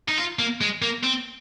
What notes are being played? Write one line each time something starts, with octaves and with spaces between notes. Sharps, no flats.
D#4
F4
A#3
G#3
A#3
C4